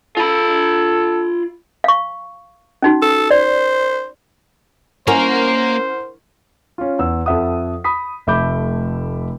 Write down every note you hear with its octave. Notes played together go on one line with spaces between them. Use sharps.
F4 A4 B5
F5 C#6
C#4 D#4 F#4
A4
C5 D5
A#3 C#4 E4 A#4 C5 F#5 A#5
C#4 F4
E2 E6
F2 A4 E5 F#5 D#6
B5 D#6 B6
F1 A3 E5 B5 D6 G6